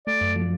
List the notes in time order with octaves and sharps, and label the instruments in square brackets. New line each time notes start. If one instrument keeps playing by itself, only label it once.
[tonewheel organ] A3 [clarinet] D5
[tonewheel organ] F#2
F3